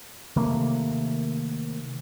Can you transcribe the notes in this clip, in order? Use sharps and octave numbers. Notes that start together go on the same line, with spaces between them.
C3 D#3 A3 A#3